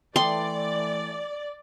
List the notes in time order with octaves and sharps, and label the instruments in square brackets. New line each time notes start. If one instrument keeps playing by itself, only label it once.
[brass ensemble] E3 A3 [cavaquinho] A4 G5 D#6 [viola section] D5 [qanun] C6